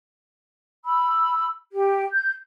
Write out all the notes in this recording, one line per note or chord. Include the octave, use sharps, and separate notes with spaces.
B5 E6
G4
G6